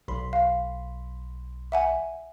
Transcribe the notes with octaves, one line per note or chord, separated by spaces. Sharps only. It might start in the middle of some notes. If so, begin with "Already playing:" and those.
B1 B5 C6
F5
E5 F#5 G#5